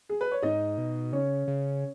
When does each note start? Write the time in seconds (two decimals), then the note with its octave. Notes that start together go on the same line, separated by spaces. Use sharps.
0.09 G#4
0.21 B4
0.32 C#5
0.42 G#2 D#4 D#5
0.78 B2
1.12 C#3 C#4 C#5
1.48 C#3